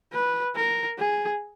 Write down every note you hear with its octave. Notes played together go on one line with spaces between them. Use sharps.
B4
A#4
G#4